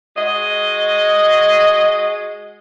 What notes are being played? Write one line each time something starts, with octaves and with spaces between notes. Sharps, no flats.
G#3 F#4 D#5